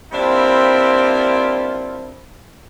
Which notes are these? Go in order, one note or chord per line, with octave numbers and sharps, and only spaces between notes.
G3 A#3 C4 D4 E4 F4